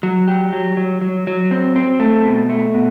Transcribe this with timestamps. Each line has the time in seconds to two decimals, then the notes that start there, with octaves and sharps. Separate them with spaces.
0.03 F#3
0.28 G4
0.53 F#3
0.77 F#3
1.01 F#3
1.27 F#3
1.51 C4
1.76 C4
2.00 A3
2.26 B2
2.50 A3
2.74 B2